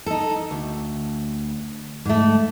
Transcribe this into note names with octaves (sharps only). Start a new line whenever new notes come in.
D#4 A4
D2
G#2 A3